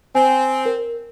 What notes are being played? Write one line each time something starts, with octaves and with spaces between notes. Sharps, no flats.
C4 G#5
A#4